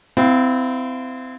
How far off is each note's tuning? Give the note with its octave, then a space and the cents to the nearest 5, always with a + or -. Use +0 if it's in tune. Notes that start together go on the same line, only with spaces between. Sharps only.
C4 -30 E4 +0 F5 +0